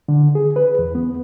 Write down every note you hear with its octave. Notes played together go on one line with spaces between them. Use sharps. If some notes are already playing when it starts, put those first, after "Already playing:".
D3
G#4
B4
E2
B3